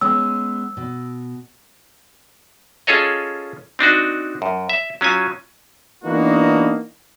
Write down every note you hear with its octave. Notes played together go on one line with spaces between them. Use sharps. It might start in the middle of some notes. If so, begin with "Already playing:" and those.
G#3 B3 C#4 E6
B2
C#4 F4 G#4 A4 C#5 D#5
C4 D4 D#4 F#4
F#2
E5
F#3 C#4 F4 G#5
E3 A#3 B3 D4 D#4 F#4